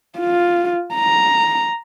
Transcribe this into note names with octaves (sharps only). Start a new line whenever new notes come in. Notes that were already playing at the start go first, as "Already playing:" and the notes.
F4
A#5